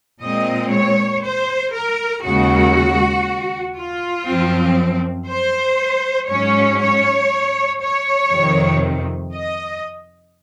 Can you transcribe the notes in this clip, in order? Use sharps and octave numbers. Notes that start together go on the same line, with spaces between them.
A#2 G#3 C4 D#5
C#5
C5
A#4
D#2 C#3 G#3 F#4
F4
F#2 F3 C4
C5
G#2 F#3 C#4 C#5
C#5
C#5
F2 C3 D#3
D#5